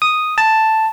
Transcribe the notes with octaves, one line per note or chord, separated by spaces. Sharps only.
D#6
A5